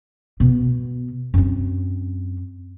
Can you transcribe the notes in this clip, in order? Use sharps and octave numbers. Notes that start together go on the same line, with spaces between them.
B2 B3
F#2 C4